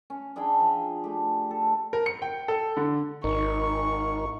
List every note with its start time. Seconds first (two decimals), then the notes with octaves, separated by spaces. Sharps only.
0.10 C#4
0.36 D4 E4 G#4 G5
0.60 F3
1.04 A3 G4
1.51 A4
1.93 A#4
2.06 C#7
2.22 G5
2.48 A4
2.77 D3
3.24 G#1 D#4 A#4 C#6